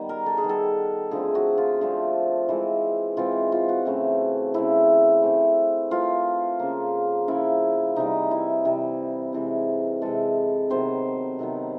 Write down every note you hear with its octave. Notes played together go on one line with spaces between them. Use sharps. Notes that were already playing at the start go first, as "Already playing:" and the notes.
Already playing: D#3 G3 B3
A#4
A4
G#4
D#3 G3 B3
A4
D3 F3 A3 C4 G#4
F#4
F4
D3 F3 A3 C4
E3 G#3 C4
E3 G#3 C4 F4
F4
F#4
C#3 E3 A3 C4
C#3 E3 A3 C4 E4
E3 A3 C4
E3 A3 C4 F4
C#3 F3 A#3
C#3 F3 A#3 E4
C3 E3 G3 D#4
E4
C3 E3 G3
C3 E3 G#3
C3 E3 G#3 A4
C3 D#3 F#3 B3 C5
C3 D#3 F#3 B3